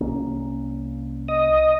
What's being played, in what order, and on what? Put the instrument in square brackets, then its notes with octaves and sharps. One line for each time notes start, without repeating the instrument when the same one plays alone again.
[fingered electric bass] C2 A#3 C#4
[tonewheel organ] D#5